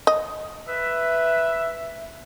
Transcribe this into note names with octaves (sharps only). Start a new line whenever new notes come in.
D#5
B4 E5